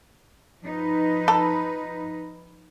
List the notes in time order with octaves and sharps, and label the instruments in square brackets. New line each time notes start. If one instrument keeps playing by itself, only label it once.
[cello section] F3 D#4 B4
[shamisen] A4